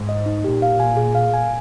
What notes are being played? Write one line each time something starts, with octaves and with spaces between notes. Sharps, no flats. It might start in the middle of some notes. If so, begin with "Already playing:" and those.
Already playing: G#2
D#5
D#4
A#2 G4
F5
G#5
G#4
F5
G#5